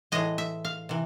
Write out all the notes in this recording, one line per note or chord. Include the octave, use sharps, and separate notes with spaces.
A2 E3 G#3 D#5
E5
F5
C3 E3